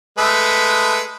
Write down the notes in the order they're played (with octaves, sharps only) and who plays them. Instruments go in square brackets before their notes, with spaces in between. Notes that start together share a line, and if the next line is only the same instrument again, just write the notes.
[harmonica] G#3 A3 B4